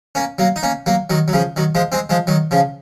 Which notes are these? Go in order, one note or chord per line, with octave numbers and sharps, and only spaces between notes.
A#3 C#4
F#3 A#3
D#4
A#3 C#4
F#3 A#3
D#3 F#3
F#3
C#3 F3
D#3 F#3
F3 G#3
G#3 C4
F3 G#3
D#3 F#3
C#3 F3